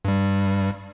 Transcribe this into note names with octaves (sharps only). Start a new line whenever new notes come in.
G2 G3